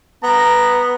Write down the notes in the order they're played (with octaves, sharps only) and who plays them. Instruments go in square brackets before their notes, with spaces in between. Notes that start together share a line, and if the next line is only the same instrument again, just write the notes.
[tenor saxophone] B3 [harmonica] A#5